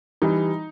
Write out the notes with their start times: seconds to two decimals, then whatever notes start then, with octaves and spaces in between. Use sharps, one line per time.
0.22 E3 G3 D#4